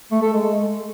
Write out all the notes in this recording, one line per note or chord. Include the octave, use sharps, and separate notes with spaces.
A3
A4
G#3